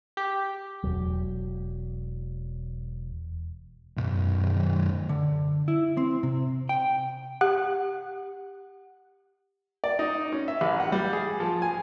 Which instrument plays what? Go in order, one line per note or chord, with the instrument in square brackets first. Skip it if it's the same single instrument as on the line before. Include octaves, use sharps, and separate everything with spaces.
[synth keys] G4
[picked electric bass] E1 F#3
[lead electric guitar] B1 F#2
[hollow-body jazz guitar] D3
E4
C4
C3
G5
[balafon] G4 [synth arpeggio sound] F#5
[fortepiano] D5
D#4
C#4
E5
A1
F#5
G3
G#4
F3
G#5